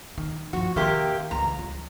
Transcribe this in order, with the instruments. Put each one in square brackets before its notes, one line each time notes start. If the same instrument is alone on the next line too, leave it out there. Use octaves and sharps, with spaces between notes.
[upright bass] D#3
[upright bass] G2 F3 [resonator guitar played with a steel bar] F#4
[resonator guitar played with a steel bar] C3 A#3 G4 [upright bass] D#3
[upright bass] C#2 E3 [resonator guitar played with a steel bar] A#5
[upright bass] G3